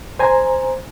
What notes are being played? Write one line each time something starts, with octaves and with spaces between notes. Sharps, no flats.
C5 G#5 A#5